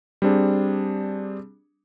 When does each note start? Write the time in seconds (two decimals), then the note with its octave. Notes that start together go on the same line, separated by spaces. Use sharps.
0.22 G3 C4 D4 G#4